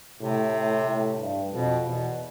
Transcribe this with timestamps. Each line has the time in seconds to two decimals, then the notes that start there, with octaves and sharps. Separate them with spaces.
0.20 A2 C3
0.53 A2
0.87 A2
1.20 G2
1.54 F2 B2
1.86 E2 B2